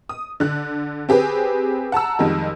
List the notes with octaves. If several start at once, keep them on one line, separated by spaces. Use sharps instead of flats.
D#6
D3 F#6
C4 G4 G#4 B4
F#5 A5 A#5 E6
F2 D#3 G3 G#3